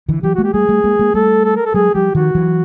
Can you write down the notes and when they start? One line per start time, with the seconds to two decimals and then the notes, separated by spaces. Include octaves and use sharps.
0.09 D3 E3
0.23 E3 F#3 G4
0.35 G#3 A#3 F#4
0.44 G4
0.53 G3 A3 G#4
0.69 G3 A3
0.84 G#3 A#3
0.99 G#3 A#3
1.14 G3 A3 A4
1.45 A4
1.56 A#4
1.66 A4
1.74 F#3 G#3 G#4
1.95 F3 G3 G4
2.15 D#3 F3 F#4
2.35 E3 F#3